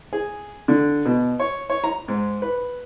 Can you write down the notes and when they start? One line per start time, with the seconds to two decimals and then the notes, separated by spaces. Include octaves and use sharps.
0.13 G#4
0.68 D3
1.05 B2
1.40 C#5
1.70 C#5
1.84 A#5
2.08 G#2
2.42 B4